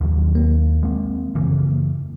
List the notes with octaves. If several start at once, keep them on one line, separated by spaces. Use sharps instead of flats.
D#2 D#3 F#3
A#3
G#3 C4
F#2 C#3 E3